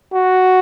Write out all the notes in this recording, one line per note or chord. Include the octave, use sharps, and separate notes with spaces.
F#4